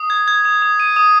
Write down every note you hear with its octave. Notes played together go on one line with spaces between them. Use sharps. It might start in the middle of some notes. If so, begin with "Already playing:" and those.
Already playing: D#6
G#6
G#6
D#6
D#6
D#7
D#6